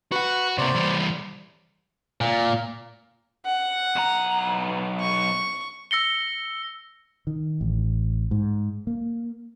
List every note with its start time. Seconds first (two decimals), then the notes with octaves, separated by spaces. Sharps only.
0.12 F#4 B4 F#5 C#6
0.58 C3 A#3 C5 D5
0.75 E3 G3
2.21 A#2
3.46 F#5
3.96 B1 A#5
5.00 C#6
5.91 E6 A#6 C#7 G7
7.27 D#3
7.61 A1
8.31 G#2
8.87 A#3